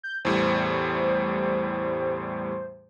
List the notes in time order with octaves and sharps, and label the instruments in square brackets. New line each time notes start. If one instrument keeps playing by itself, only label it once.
[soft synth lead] G6
[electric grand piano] E2 A2 G3 [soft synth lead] C5